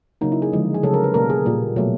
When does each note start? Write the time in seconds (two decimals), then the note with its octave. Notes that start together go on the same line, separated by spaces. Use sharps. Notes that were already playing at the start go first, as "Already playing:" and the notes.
0.21 C#3 F#3 A#3 D#4
0.32 E4
0.42 G#4
0.52 D3 F3 G#3
0.74 G#4
0.83 C#3 F#3 A3 A4
0.94 A#4
1.04 B4
1.14 B2 G3 A#3 A#4
1.30 G#4
1.45 A#2 G3 A#3
1.76 B2 F#3 A3